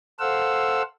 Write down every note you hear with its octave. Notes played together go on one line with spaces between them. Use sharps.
A4 C5 F5 F#5 E6